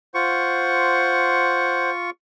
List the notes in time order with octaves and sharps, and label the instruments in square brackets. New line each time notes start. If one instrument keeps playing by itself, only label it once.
[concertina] F4 C#6 [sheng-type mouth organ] C5 F#5